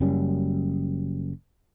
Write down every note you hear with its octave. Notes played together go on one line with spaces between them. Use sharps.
F#1 F#2 G3 C#4